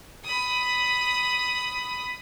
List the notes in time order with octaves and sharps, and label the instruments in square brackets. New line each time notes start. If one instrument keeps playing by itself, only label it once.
[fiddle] B5 D#6